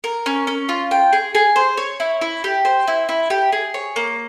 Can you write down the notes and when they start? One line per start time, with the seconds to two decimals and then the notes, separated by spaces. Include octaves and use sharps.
0.04 A#4
0.26 C#4
0.47 C#4
0.69 F4
0.91 G5
1.13 G#4
1.35 G#4
1.56 C5
1.77 C#5
2.00 E4
2.21 E4
2.44 G4
2.65 C5
2.88 E4
3.09 E4
3.30 G4
3.52 G#4
3.74 C#5
3.96 A#3